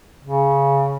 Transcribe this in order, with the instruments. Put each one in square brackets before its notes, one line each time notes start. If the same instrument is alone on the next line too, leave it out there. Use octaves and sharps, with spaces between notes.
[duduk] C#3